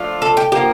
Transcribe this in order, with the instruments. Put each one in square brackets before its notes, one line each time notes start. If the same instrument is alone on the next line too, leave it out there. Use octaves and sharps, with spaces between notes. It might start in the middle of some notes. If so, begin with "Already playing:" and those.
Already playing: [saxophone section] F3 A3 D4 F4
[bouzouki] A4
G4
[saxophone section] D3 F3 A#3 [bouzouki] G4